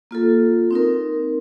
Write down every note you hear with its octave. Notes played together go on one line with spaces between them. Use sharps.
A#3 F4 A4
C4 D#4 A#4